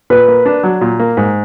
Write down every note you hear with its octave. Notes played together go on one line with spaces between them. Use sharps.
A#2 B4
A#3
D4
F#3
A#2
A#3
G#2